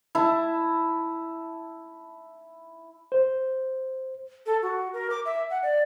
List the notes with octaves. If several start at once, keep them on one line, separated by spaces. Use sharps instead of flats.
E4 A5
C5
A4
F#4
A#4
D6
E5
F#5
D5